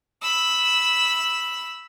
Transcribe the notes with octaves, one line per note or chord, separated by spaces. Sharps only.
B5 E6